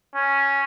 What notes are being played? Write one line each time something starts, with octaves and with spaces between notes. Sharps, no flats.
C#4